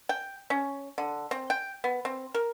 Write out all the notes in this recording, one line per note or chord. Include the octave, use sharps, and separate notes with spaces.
G5
C#4
D3
C4
G5
B3
C4
A#4